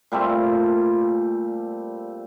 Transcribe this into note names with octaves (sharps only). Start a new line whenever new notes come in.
A#2 G3 A3 C4